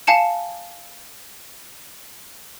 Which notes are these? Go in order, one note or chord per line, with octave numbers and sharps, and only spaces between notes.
F5 G#5 A5 C#7 E7